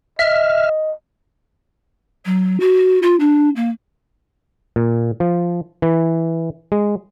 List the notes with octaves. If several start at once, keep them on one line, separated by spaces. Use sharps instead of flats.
D#5 E5 F6
F#3
F#4
F4
D4
A#3
A#2
F3
E3
G#3